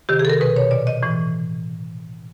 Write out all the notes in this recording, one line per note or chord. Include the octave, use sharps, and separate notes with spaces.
C3 D#3 G4
G#4
A4
A#4
B2 B4
C#5
A#2 D5
D#5
A2 E3